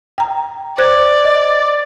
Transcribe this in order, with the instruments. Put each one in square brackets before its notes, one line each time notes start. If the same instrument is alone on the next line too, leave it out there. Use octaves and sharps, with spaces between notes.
[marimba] G5 A#5
[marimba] C5 F#6 G#6 [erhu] D5
[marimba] D#5